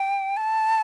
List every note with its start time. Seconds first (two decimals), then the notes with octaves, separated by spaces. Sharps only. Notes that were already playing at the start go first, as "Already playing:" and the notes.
Already playing: G5
0.37 A5